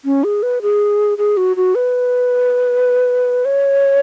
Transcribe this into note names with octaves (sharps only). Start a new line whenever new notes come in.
C#4
G#4
B4
G#4
G#4
F#4
F#4
B4
C#5